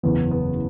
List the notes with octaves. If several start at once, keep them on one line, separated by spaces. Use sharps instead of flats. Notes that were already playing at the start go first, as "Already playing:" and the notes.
F#1 E2 C#3 E3 B3
B3